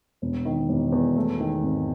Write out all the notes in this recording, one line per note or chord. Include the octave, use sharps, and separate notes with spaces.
E1
D#3
E1
E2
A3
D#3
G#1